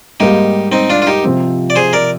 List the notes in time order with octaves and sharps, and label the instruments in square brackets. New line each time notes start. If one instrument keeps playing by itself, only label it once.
[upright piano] G#2 G3 A#3 [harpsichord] D#4 G4
[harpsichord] C4 D#4
D4 F4
F4
D#4 G4
[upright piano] C3 F3 C4
[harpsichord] D5
G#4 C5
A#4 D5